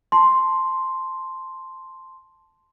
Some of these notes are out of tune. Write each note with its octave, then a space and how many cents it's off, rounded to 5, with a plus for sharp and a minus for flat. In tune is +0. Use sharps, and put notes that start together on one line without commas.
A5 -5 C6 +0